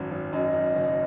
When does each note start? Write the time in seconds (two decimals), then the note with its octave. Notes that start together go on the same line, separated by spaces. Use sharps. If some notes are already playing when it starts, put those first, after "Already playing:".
Already playing: G#1 F#2
0.11 G#1
0.32 F#2 D#5
0.54 F#2
0.76 F#1